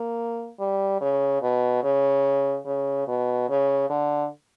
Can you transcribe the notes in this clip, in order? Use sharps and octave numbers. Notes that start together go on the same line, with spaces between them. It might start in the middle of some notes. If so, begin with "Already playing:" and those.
Already playing: A#3
G3
C#3
B2
C#3
C#3
B2
C#3
D3